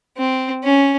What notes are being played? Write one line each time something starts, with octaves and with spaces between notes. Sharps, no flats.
C4
C#4